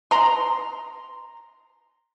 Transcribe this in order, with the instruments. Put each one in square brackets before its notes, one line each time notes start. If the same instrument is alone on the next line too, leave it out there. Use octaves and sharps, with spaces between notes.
[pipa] A#5 C6